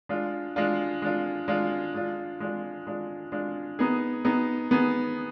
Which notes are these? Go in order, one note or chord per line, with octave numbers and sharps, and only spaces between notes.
G#3 D4 F4
G#3 D4 F4
G#3 D4 F4
G#3 D4 F4
G#3 D4 F4
G#3 D4 F4
G#3 D4 F4
G#3 D4 F4
B3 D#4 G#4
B3 D#4 G#4
B3 D#4 G#4